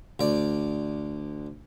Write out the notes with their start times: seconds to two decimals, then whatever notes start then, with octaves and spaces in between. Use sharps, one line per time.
0.20 D2 D5